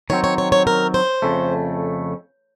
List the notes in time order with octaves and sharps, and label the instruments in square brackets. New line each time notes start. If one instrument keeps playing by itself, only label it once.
[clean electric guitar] D#3 F#3 C4 [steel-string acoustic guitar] C#5
[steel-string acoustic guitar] C#5
C#5
C#5
A#4
C5
[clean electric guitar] F2 C#3 A3